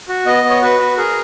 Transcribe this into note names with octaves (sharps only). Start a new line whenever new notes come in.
F#4
B3 D#5
B3
C#5
F#4 B4
F#4
G#4 A#4